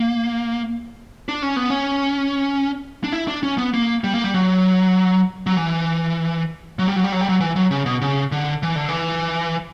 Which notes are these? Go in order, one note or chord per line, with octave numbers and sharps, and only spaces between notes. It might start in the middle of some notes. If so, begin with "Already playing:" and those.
Already playing: A#3
D4
C#4
B3
C#4
D4
E4
D4
C#4
B3
A#3
G3
A#3
G3
F#3
F#3
E3
F#3
G3
F#3
G3
F#3
G3
F#3
E3
F#3
C#3
B2
C#3
D3
E3
D3
E3